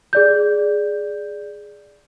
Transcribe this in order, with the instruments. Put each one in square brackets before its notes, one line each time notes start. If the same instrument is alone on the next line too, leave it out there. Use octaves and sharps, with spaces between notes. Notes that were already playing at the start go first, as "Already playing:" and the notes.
[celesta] G#4 D5 G6